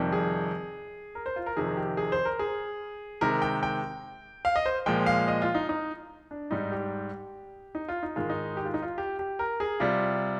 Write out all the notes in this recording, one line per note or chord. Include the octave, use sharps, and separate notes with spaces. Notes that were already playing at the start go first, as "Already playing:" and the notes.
Already playing: F2 C3 D#3 G3
G#4
A#4
C5
F4
A#4
F2 C3 D#3 G#4
G4
G#4
C5
A#4
G#4
C3 D#3 G#3 A#4
G5
G5
F5
D#5
C5
A#2 F3 G#3 G5
F5
D#5
F4
D#4
D#4
D4
G#2 G3 D#4
G4
D#4
F4
D#4
G#2 D#3 G#3 F4
D#4
G4
F4
D#4
F4
G4
G4
A#4
G#4
C3 G3 F4